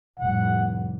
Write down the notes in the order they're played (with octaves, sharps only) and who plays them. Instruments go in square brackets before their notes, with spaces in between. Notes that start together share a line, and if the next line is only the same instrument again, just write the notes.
[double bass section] F1 A2 G3 [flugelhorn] F#5